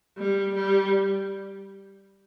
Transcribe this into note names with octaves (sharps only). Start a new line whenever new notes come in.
G3
G3